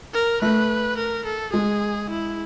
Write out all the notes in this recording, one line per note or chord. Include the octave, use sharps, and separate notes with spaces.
A#4
A3 B4
A#4
A4
G#3 G#4
E4